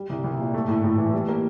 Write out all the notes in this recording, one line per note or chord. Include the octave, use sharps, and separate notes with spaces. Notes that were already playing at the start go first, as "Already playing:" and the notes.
Already playing: G3
C2
C2
A#2
A3
A2
A2
E3
G3
A#3